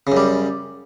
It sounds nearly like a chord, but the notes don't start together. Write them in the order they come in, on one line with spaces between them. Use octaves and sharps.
C#3 F#2 G3